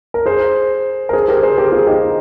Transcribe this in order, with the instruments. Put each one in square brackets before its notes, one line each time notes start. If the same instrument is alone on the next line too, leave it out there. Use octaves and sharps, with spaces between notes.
[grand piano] A#4
G#4 C5
A#4
G#4 C5
G4 A#4
G#4 C5
G4 A#4
F4 G#4
D#4 G4